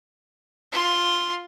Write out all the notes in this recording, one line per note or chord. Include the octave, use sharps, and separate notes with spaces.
F4 C6